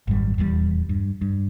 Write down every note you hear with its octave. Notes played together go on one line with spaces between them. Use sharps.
G#1 F#2 G3
D#1 E2 D#3 G3
G2
G2